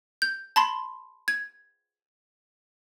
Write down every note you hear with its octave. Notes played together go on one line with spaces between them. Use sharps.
G6
A5 B5 C6
G#6